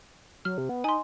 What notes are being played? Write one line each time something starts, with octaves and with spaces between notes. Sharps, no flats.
F#3 F6
C3
B3
D#4 G#5 C6